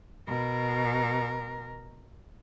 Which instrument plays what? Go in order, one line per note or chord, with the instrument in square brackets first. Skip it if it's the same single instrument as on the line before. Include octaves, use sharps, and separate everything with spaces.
[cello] B2 A#4